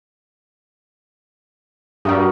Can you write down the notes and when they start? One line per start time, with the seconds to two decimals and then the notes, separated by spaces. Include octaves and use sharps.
2.05 G2 G3 F#4 A#4 D#5